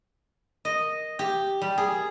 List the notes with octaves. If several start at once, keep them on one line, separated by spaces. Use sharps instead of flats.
D#5
G4
G3
G#4